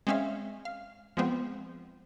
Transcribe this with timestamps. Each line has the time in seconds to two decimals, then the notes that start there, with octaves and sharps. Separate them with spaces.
0.07 G#3 C4 C#4 E5 F5
0.65 F5
1.17 F3 G#3 B3 C4